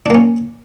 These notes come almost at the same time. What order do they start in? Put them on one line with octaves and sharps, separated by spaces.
D4 A#3 C#4